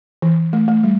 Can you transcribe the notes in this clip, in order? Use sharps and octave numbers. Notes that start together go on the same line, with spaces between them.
E3
A3
A3
G3